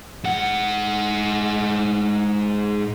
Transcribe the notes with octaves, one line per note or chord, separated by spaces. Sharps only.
G#2 F#5